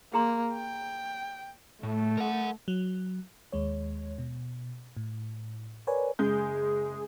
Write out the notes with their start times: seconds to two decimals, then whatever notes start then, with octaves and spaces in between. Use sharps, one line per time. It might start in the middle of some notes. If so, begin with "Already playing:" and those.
0.14 A#3 G#4 A#5 C6
0.53 G5
1.83 A2 A3
2.17 A#4 F#5
2.68 F#3
3.52 D#2 G#3 C#5
4.18 B2
4.97 A2
5.87 A#4 B4 C#5 D5 G#5
6.19 F#1 G#3 G#4 G6